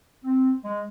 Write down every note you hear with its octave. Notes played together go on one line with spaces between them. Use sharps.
C4
G#3